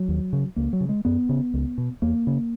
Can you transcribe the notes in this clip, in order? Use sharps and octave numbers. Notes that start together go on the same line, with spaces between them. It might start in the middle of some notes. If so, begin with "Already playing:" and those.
Already playing: F#3
D#2
C#3
C#2 A#3
F#3
C#3
G#3
F#2 B3
C#3
C#2
B2
E2 A#3
C#3